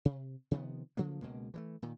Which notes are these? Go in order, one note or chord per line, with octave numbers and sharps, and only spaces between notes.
C3
C3 D#3 F3 B3
C#3 F3 F#3 A#3
C#2 B2 G#3 A#3
E3 F3 A3
A#2 D#3